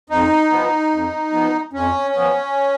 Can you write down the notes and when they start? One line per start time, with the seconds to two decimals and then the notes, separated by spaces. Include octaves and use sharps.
0.10 F2 D#4
0.51 F3 B3
0.91 F2
1.33 F3 B3
1.73 F2 C#4
2.15 F3 B3